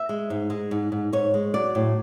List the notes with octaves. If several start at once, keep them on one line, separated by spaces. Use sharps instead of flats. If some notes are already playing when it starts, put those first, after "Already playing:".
Already playing: E5
G#3
G#2
G#3
G#2
G#2
G#2 C#5
G#3
F#3 D5
A2